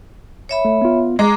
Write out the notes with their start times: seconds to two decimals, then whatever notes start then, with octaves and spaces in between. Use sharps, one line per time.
0.49 C#5 E5 B5
0.65 A3
0.82 B3 F4
1.19 G#3 A#5 D6